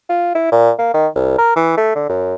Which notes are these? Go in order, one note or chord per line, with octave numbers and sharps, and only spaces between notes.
F4
E4
A#2
A#3
D#3
C2
A#4
E3
A3
D3
F#2